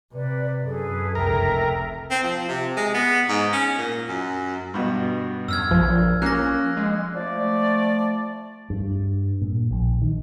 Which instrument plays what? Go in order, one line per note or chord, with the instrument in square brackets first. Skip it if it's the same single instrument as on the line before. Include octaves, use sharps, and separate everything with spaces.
[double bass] C3 [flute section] B4 D5
[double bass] F#2 [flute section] G#4 A4 B4
[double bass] F1 C#2 [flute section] A4 E5 G5 [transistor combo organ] A#4
[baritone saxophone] C4
F3
C3
G#3
B3
G#2
C#4
A#2
F#2
[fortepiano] G2 B2
[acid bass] F#2 [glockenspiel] E6 F6 G#6
[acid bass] A#1 [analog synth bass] F3
[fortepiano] A#3 [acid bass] C#4 [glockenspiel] F#6 A#6
[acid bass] G#3
[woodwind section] F3 A3 D5
[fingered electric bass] G2
A#2
A#1
D#3